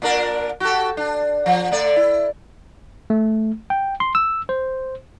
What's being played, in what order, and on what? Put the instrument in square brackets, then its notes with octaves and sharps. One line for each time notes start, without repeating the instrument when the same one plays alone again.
[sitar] A#2 D4 A#4
F#4 G4 A4
D4
F3
D3 A3 D5
E4
[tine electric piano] A3
G5
C6
E6
C5